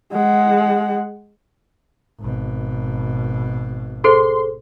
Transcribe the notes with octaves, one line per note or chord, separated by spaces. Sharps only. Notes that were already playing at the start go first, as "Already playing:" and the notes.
G#3 F#5
G#1 B2
G#4 A4 C5 C6